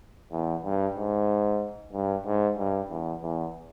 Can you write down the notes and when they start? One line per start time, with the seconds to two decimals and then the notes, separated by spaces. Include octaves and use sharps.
0.32 E2
0.65 G2
0.96 G#2
1.93 G2
2.26 G#2
2.58 G2
2.90 E2
3.22 E2